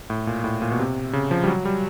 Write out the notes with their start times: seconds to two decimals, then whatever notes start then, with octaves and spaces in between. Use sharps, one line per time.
0.10 A2
0.27 A#2
0.44 A2
0.62 A#2
0.71 B2
0.79 C3
1.13 C#3
1.31 F3
1.44 G3
1.48 F#3
1.65 G3